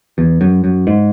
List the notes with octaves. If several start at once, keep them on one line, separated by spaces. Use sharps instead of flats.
E2
F#2
F#2
G#2